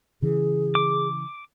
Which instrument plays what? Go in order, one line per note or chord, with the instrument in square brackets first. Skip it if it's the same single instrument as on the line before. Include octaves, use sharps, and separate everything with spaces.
[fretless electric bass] C#3 E3 [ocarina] G#4
[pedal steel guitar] D6